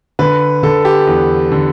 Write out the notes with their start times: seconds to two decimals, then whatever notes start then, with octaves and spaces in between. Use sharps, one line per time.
0.19 D3 B4
0.63 D3 A4
0.85 G4
1.07 E2
1.52 D3